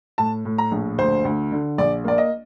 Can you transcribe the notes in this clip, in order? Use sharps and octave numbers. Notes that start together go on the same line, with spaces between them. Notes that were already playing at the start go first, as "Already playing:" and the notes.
A2 A5
A2
A#5
A#1
D2 C5
D2
D3
A#1 D5
A#3 D5
D#5